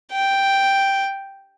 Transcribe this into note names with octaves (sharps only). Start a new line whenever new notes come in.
G5